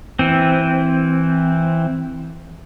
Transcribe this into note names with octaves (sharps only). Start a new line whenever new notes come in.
E3 C4